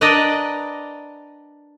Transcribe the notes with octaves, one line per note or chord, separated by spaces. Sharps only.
D4 A#4 B4 D5 D#5 G5